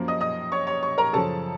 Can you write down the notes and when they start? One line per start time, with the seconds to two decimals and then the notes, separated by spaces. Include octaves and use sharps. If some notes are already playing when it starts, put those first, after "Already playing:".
Already playing: F#2 F3 A#3
0.08 D#5 D#6
0.21 D#5 D#6
0.52 C#5 C#6
0.67 C#5 C#6
0.82 C#5 C#6
0.98 A#4 A#5
1.13 F#2 C#3 F3 A4 A5